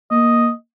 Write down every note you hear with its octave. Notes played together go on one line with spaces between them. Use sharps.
A#3 D#5